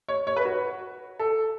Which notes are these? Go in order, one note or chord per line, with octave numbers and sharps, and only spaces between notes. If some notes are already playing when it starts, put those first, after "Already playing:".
C#5
C#5
B4
F#4
A4